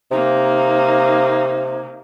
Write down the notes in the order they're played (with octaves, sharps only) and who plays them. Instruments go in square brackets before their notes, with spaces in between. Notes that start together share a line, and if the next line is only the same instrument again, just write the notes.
[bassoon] C3 [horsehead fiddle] A#3 D#4